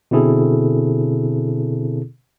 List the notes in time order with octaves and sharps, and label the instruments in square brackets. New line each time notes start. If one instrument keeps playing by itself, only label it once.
[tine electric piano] B2 D3 C4 E4 G#4 A4